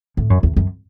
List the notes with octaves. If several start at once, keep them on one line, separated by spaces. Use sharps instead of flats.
A2
F#2
E2
F#2